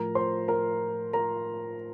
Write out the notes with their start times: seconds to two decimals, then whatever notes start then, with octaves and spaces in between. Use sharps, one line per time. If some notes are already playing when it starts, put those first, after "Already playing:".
Already playing: A2 F3 A#4 A#5
0.15 C5 C6
0.48 A#4 A#5
1.13 A#4 A#5